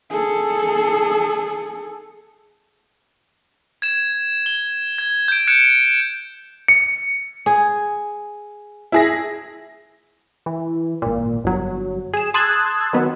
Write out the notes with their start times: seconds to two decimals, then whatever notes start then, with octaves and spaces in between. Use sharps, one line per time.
0.10 G#4 A4
3.82 G#6 E7
4.46 G7
4.98 G#6
5.28 G6 D7
5.47 F#6 G#6 C#7 D7 E7
6.68 C#7
7.46 G#4
8.92 E4 G#4 A#6
10.46 E3
11.02 G#1 A#2
11.44 G1 F#3
12.14 G#4 E7
12.34 A5 C6 D#6 E6 F#6 G#6
12.93 D#3 F#3 B3